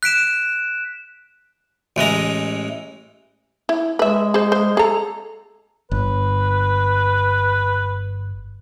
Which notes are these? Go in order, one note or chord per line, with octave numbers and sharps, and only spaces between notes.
F#6 B6 D7 E7
A1 E3 G#3 A#5
E4
G#3 B4 E5
G#4 C5
C5
G#4 A4 A#5
G1 B4